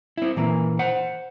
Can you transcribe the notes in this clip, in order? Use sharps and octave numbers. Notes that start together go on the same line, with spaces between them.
C4 E4
A#2 E3 A#3
C5 F#5